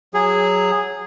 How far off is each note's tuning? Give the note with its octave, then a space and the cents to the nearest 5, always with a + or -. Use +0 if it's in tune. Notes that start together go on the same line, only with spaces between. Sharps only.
F#3 +0 G#4 -10